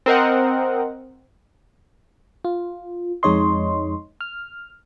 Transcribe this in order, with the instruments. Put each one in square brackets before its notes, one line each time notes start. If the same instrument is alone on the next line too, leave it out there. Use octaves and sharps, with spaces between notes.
[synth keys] C4 A#4 D#5 F#5
[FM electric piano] F4
F2 G#3 D#4 C#5 D#5 C6
F6